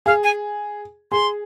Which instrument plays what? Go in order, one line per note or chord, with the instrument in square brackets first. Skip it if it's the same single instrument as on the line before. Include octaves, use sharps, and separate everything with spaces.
[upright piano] G#4 [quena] F5
[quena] G#5
[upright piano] G#4 [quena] C6